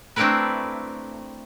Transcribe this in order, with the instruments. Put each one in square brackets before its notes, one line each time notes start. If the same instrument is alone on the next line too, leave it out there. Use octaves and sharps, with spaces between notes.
[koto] A3 C4 D4 E4 A#4 B4